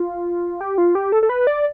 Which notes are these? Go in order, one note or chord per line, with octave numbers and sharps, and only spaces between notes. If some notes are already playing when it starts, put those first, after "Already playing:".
Already playing: F4
G4
F4
G4
A4
A4
B4
D5